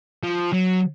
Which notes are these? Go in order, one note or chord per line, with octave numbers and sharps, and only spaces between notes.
F3
F#3